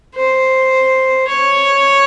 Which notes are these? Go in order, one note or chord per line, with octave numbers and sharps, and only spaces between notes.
C5
C#5